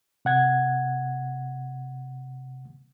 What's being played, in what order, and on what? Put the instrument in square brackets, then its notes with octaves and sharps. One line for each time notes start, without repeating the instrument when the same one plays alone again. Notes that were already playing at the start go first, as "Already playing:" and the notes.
[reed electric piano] C3 F#5 G#6